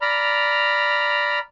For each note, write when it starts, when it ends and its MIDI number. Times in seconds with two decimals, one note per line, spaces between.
0.02 1.39 74
0.02 1.39 82
0.02 1.39 83
0.02 1.39 89